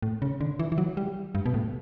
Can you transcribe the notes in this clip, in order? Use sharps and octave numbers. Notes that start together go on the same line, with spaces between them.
A2
C#3
D3
E3
E3
F#3
G3
G2
B2
A2